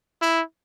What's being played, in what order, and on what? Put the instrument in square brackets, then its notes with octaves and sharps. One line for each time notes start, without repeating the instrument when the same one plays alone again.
[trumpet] E4